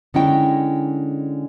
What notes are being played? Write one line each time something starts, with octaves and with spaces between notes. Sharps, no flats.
D3 G#3 C#4 D#4 E4 G5